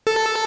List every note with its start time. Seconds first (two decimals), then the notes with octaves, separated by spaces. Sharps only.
0.07 A4